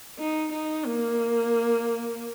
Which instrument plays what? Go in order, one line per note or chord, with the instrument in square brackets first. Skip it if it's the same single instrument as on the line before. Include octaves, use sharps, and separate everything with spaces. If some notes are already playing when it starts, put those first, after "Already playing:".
[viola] D#4
D#4
A#3